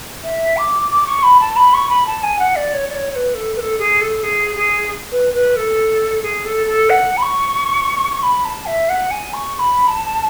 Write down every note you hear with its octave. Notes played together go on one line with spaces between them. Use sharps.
E5
D6
D6
C#6
B5
A5
B5
C#6
B5
A5
G#5
F#5
D5
C#5
D5
C#5
C#5
B4
A4
B4
A4
G#4
A4
G#4
G#4
B4
B4
A4
G#4
A4
A4
F#5
B5
C#6
C#6
B5
A5
E5
F#5
G#5
C#6
C#6
B5
A5